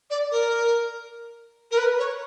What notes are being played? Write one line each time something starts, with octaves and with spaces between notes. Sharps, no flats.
D5
A#4
A#4
B4
C#5